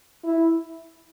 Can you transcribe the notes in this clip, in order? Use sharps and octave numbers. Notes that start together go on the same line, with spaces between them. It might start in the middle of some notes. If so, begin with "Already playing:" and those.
E4